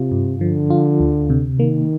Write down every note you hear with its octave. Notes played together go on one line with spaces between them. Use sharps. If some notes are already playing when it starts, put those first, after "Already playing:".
Already playing: C3 F4
G2
D3 F3
F4
D2
C3
D#3 A#3